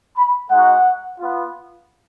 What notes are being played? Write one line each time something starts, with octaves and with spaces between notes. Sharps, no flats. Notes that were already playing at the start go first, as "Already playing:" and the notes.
B5
G#3 D#4 F#4 F#5
B3 F4